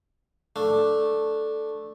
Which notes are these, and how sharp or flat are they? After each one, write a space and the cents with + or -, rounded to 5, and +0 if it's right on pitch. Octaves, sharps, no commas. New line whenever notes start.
A3 +0 D4 +0